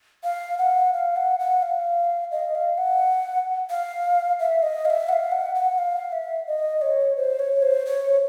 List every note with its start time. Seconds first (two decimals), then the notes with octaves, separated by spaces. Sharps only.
0.24 F5
0.59 F#5
0.93 F5
1.16 F#5
1.39 F#5
1.62 F5
2.32 D#5
2.55 F5
2.78 F#5
3.70 F5
4.40 E5
4.63 D#5
4.85 F5
4.90 E5
5.09 F#5
5.13 F5
5.32 F#5
5.55 F#5
5.78 F5
6.12 E5
6.47 D#5
6.82 C#5
7.17 C5
7.39 C#5
7.62 C5
7.86 C#5